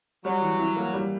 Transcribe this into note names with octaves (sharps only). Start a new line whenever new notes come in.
F#3 G3
E3
E4
A#3
G3